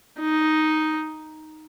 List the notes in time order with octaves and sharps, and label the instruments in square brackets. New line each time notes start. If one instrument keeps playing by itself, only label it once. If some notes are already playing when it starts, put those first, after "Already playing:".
[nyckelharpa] D#4